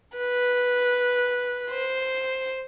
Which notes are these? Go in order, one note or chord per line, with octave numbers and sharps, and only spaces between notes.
B4
C5